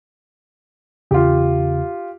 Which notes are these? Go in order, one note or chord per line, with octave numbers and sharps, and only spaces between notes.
E2 C#3 F4 G4